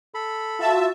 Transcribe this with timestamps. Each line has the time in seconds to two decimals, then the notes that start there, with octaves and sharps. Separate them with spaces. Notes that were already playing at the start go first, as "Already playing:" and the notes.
0.14 A4 B5
0.60 F4 F#4 E5 A5